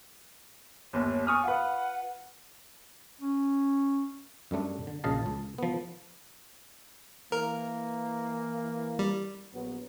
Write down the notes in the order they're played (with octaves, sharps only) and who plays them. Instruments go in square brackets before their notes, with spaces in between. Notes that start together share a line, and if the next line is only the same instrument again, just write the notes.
[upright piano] G1 D#2 [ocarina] C#5
[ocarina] G#5 [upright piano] C#6 D#6 F6
[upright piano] F4 B4 [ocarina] F#5
[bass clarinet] C#4
[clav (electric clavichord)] F#2 G3 A3 D4
D3
A#1 F#2 C#3 D#5 F5 A5
C#2 A5
F3 B3
[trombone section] E3 A#3 [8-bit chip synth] A#4
[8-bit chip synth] G3
[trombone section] A#1 F#3 B3